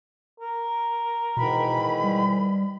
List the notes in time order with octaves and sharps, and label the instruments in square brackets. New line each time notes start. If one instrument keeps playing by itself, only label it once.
[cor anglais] A#4
[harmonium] G#2 D#3 E3 [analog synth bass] B2 [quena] B5
[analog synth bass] G3